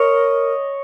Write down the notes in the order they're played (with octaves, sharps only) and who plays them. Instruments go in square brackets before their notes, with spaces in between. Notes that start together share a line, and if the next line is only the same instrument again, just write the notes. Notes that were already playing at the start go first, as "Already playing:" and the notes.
Already playing: [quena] A#4 [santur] C#5 D#5